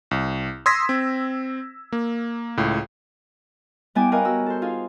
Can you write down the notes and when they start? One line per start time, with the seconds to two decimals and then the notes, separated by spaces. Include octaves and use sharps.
0.11 C2
0.66 C6 D#6 E6 G#6 A#6 B6
0.89 C4
1.92 A#3
2.57 C#2 A2
3.95 G3 B3 E4 D5 G5 G#5
4.12 A#4 B4 C#5 D#5 F5 G#5
4.25 F#4 E6
4.46 A4 C5
4.62 D#4 F4 G#4 F5